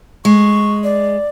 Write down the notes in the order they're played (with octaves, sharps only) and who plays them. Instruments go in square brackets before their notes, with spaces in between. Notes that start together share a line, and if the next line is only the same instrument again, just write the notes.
[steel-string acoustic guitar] G#3 [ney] C#6
[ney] D5